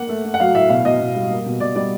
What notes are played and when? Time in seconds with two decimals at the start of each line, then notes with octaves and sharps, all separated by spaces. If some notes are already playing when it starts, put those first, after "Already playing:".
Already playing: A#3 F#5
0.09 A3
0.25 A3
0.34 F#5
0.40 F#3 F5
0.54 A2 E5
0.70 B2 F5
0.85 B2 D#5
1.01 B2
1.16 G3
1.30 A#3
1.46 B2
1.60 B2 D5
1.76 G3 D5